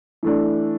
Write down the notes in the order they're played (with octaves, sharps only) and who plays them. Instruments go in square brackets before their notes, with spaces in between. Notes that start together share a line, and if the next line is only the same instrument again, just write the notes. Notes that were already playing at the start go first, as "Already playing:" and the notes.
[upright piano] E3 A3 D4